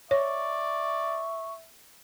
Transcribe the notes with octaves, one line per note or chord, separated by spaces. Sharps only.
C#5 D5 E5 C#6